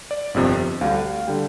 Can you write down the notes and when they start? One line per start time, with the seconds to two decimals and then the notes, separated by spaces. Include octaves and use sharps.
0.11 D5
0.34 G1 F2 C3 F3
0.81 D2 D3 G3 F5
1.27 D3 G3 G5